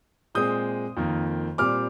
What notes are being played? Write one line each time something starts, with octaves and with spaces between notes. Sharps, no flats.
A#2 G#3 C4 D#6 G6
F2 D#3 A#3
A#2 G3 C4 D6 F6